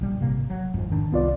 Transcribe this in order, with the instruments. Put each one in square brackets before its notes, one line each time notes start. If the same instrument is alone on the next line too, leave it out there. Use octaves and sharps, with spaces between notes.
[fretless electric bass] A#1 G3
G#1 C3 A#3
F#3
[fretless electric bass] G#1 F2 [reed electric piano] G#2
[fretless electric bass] D#3 D4
[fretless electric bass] C2 [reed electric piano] B3 F4 D5